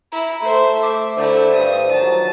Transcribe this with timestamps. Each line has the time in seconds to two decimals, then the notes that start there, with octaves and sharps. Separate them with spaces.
0.12 E4 A#5
0.42 A3 C5 E5 C6
0.82 E5 D6
1.17 D3 A3 E4 C5
1.54 G2 D#6
1.91 D#3 F3 F#3 A5